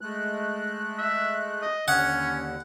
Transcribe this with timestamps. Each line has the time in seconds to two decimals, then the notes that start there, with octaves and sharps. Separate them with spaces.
0.01 G#3 A3 F#6
0.98 E5
1.62 D#5
1.88 D#2 D3 C#4 F#5